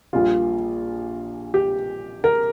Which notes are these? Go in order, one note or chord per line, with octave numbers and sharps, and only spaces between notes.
A#1 A#2 G3 F4
G4
A#4